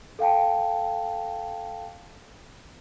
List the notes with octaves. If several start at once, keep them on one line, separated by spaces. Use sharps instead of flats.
A4 F5 G5 A5